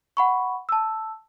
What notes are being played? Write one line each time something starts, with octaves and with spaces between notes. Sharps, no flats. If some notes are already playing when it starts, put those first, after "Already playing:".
F#5 B5 C#6
A5 E6